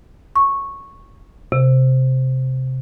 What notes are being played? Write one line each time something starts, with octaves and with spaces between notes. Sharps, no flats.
C#6
C3